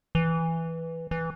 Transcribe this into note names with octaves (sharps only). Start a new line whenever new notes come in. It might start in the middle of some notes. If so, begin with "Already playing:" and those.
E3
E3